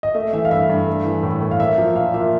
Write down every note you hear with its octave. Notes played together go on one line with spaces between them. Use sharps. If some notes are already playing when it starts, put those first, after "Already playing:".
D#5
A3 E5
E3 E5
F5
G2 E5
G2
A3
E3
A2
A2
F5
A#3 E5
F3
A#2 F5
A#2 E5